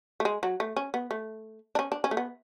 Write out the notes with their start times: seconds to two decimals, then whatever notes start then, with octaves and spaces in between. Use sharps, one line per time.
0.20 A3
0.25 G#3
0.43 F#3
0.60 A3
0.76 C#4
0.94 B3
1.11 A3
1.75 D4
1.79 C#4
1.92 D4
2.04 C#4
2.11 A3
2.17 B3